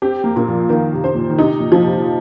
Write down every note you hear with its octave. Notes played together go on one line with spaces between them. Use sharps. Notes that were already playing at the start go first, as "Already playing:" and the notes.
C4 G4
A#3
A#2
F3
D#3 A#3
C3
C5
A#2
D#3
C3 D#4
A#2
F3
C3